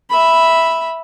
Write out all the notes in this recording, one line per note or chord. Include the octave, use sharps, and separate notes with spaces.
E5 B5